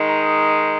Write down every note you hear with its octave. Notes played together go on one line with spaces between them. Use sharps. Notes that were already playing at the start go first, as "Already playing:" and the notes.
Already playing: D#3 G#3 D#4
A#5